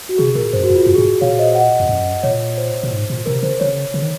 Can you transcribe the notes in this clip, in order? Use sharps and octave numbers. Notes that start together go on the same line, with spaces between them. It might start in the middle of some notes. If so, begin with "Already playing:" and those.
F#4
C3 G#4
A#2 A#4
F#2 C5
F#4
F2 F4
F#2 F#4
G#2 G#4
A#2 C#5 F5
C5 D#5
D#5 F#5
F2
F#2
A#2 C#5
C5
A#2
G#2
A#2
C3 A#4
C#3 C5
C#3 C#5
C#3
D#3